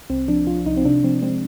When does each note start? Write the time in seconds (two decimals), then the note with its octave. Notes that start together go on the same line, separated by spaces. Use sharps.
0.10 C2 C4
0.28 F3 D4
0.47 F3 F4
0.66 C2 D#4
0.77 C4
0.85 C3 D4
1.04 F3 C4
1.22 G#3 C4